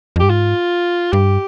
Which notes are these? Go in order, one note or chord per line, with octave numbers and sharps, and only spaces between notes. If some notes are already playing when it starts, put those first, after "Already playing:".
F2
G2 G4
G#2 F4
G2 G4